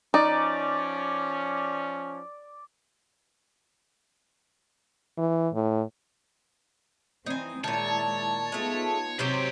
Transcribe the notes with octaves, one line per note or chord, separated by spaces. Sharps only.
F3 C#4 D#4 D5
E3
A2
E3 C4 D#4 G#5
A#2 D#3 G#3 E4 C#5 A5
G#3 A3 B3 D#4 F4
G#2 C3 F#3 C4 G4 C5